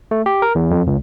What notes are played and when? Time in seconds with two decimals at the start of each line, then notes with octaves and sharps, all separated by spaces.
0.11 A3
0.26 G4
0.42 A#4
0.55 E2
0.71 F2
0.87 C#2